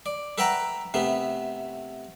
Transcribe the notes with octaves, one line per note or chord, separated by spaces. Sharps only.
D5
A4 B4 E5 F#5 G5 A#5
C3 A3 B3